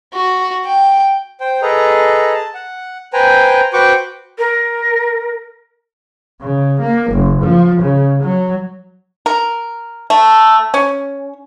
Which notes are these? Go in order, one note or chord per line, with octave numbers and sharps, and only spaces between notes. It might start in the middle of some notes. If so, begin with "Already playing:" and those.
F#4
G5
C5 G5
G#4 A4 B4 D#5 A#5
A5
F#5
B4 C5 G5 G#5 A#5
F#4 B4 C5 G5 C#6 D6
A#4
C#3
A#3
F#1
F3
C#3
F#3
A#4
A3
C#4